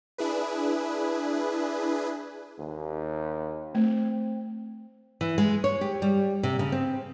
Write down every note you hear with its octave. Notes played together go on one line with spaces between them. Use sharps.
D4 E4 G#4 B4
D#2
A3 C4
E3
G#3
C#5
G4
G3
C3
C#3
C4